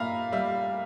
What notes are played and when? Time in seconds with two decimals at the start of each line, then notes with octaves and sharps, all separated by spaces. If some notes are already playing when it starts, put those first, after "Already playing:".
Already playing: A#2 E5 F5 A#5 B5
0.32 G3 E5